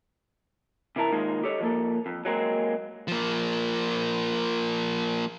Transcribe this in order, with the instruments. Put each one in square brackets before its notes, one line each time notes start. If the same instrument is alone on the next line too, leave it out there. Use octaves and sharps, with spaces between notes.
[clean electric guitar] C3 E3 E4 A#4 A5
D#3 G#3 A#3 D#4 F4
G4 A4 C#5 D#5
F3 A#3 A4
F2
F#3 G#3 A#3 C4
[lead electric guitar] F3 A#3